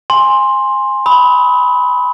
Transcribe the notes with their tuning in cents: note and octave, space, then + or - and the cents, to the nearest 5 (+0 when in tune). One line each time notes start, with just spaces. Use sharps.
G#5 -10 C6 +10
B5 +0 D#6 +40